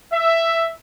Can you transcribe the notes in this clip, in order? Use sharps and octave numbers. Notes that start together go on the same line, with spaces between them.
E5